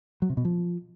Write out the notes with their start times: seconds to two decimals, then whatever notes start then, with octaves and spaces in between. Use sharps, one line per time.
0.22 F#3
0.30 C3
0.37 B2
0.45 F3